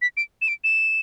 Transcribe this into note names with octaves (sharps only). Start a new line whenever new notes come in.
B6
D7
E7
D7
E7